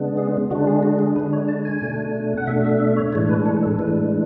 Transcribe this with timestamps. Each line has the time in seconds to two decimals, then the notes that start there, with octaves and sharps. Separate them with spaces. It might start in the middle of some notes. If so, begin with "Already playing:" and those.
Already playing: C#3 G#3 B3 D4
0.17 G#4
0.51 D3 G#3 D4 F#4
0.67 G#4
0.83 F#4
0.99 G#4
1.16 D3 G#3 D4 B4
1.33 C#5
1.48 A5
1.65 G#5
1.82 B2 A3 D4
2.37 F#5
2.47 B2 A3 D4 E5
2.64 E5
2.80 E5
2.97 C#5
3.13 A2 E3 G#3 D4 C#5
3.29 B4
3.46 A4
3.63 A4
3.79 A2 E3 G#3 D4 B4